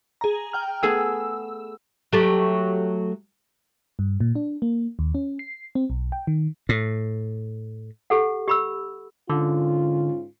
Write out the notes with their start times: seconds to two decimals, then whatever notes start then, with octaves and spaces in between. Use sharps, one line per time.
0.21 G#4 A#5
0.53 G5 F6
0.83 A3 B3 G#4 E6
2.13 F#3 A3 G4
3.99 G2
4.20 A#2
4.35 D4
4.62 A#3
4.99 D#2
5.15 C#4
5.39 C7
5.75 C4
5.90 B1
6.12 G5
6.27 D#3
6.69 A2
8.10 G4 A4 F#5
8.48 G4 B5 E6
9.30 G#2 D3 C#4 F4